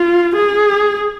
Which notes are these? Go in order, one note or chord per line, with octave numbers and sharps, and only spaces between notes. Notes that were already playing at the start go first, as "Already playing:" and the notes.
Already playing: F4
G#4